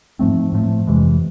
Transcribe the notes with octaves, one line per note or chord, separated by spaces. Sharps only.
G#2 F3 A3 C4
A2 F3 A3
F2 C3 E3 G#3